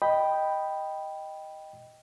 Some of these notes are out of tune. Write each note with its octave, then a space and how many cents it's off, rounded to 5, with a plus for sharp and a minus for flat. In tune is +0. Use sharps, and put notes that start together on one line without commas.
D#5 +0 G5 +0 B5 +0